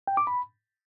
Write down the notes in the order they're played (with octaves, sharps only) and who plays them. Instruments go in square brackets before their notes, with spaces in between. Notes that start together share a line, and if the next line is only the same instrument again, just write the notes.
[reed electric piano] G5
D6
B5